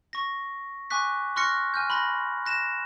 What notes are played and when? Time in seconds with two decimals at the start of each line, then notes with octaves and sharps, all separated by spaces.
0.13 C#6 A#6
0.90 G#5 C#6 D6 F#6 B6
1.36 C6 C#6 F6 F#6 A#6 C#7
1.74 G#5 F6 G6
1.90 B5 C6 F#6 A#6
2.46 F#6 A#6 E7